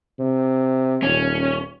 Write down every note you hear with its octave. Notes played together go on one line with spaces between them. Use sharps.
C3
D#1 C#4